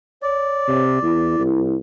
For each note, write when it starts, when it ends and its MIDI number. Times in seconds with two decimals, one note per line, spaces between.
0.22 0.84 73
0.22 1.43 74
0.68 1.02 48
1.03 1.38 40
1.03 1.75 64
1.39 1.76 36